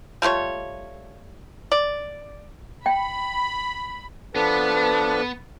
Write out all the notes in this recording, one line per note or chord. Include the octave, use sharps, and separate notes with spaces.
G3 A3 F4 C#5
D5
G5 B5
F3 B3 D4 A4 B4